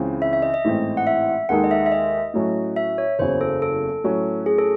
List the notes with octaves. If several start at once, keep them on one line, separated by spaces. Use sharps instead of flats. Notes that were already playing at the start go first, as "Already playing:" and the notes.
Already playing: C#2 C#3 E3 C4
E5
E5
D#5
D#5
A1 G#2 E3 A3 C4
F#5
E5
D#2 D#3 G#3 D#4 A4 F#5
D#5
E5
E5
D#5
A2 F#3 A3 C#4
E5
C#5
F#1 E2 C#3 F#3 C5
A4
A4
A2 F#3 C#4 F#4
G#4
A4